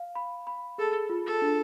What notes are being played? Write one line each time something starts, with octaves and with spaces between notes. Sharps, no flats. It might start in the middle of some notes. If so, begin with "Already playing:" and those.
Already playing: F5
B5
B5
G#4 A4
F4
A4
D4